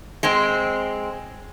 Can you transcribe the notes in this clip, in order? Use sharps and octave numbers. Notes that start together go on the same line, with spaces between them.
G#3 C4